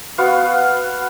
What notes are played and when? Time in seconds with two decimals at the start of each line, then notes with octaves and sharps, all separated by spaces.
0.18 B3 F#4 F5